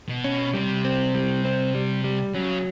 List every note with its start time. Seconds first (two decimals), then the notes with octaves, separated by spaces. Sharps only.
0.09 B2
0.24 C#4
0.54 C3 G3
0.85 C4
1.15 G3
1.44 C4
1.75 G3
2.04 G3
2.34 C#3 F#3